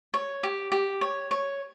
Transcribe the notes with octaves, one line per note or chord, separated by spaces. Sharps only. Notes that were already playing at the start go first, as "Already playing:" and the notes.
C#5
G4
G4
C#5
C#5